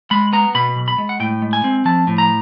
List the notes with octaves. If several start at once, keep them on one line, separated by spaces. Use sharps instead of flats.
G#3 B5
B3 A#5
B2 B5
B1
B5
G#3
F#5
A2 G5
G#3
G#5
C4
F3 A5
A2
A#5